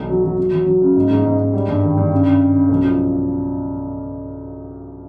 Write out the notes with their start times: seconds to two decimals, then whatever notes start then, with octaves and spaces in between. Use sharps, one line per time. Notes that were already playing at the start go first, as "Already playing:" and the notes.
Already playing: B1
0.09 F#3
0.24 F#3
0.37 F#3
0.53 F#3
0.66 F#3
0.82 C#3
0.96 G#2
1.11 G#2
1.25 G#2
1.39 G#2
1.53 G3
1.68 G2
1.82 D#3
1.97 G2
2.12 C#3
2.27 C#3
2.40 C#3
2.55 C#3
2.69 B1
2.84 F3